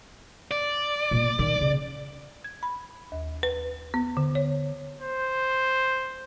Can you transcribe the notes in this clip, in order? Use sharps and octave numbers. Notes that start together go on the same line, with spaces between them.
D5
A#2 B3
D#3
C#3
G#6
B5
D#2
B4
B3
D3
C#5
C5